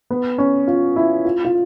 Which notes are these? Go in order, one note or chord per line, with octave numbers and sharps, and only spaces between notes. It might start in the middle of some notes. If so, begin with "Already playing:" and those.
B3
C#4
F4
E4
F4
F4